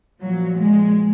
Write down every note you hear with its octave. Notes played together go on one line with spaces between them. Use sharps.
A#2 F3 F#3
G#3